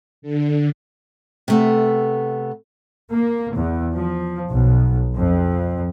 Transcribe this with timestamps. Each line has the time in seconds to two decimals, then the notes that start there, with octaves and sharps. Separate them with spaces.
0.22 D3
1.48 C3 A3 B3
3.10 A#3
3.55 E2
3.97 F3
4.52 B1
5.16 F2